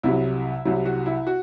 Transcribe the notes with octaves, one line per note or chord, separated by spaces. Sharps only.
C2 C3 F#3 E4
C2 C3 F#3 E4
F#4
E4
F#4